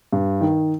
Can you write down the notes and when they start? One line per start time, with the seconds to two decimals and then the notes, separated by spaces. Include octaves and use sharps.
0.13 G2
0.41 D#3